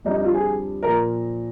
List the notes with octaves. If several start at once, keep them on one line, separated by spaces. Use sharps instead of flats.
F2 D3 G3 D#4
D#4
F4
G#4
A#2 F3 A#3 A#4